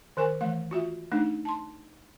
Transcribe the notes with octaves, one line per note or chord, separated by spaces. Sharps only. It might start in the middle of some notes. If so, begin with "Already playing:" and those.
D#3 A#4 G#5 C#6
E3 A3 F5
F4 F#4 E5
A3 D4 D#4
A5 C6